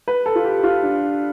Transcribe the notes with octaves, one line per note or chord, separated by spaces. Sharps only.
B4
A4
F4
G4
F4
D4